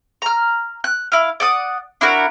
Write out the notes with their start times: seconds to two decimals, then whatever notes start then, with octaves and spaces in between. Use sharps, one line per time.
0.22 A#5 F6
0.84 F#6
1.12 E4 F5
1.40 D5 F#5 D#6
2.01 D4 E4 F#4 A#4